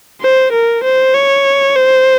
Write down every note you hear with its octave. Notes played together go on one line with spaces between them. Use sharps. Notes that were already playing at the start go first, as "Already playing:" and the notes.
C5
A#4
C5
C#5
C5